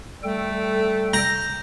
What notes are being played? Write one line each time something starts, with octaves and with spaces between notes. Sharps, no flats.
G3 A3 A4 G5
A#5 G6 A#6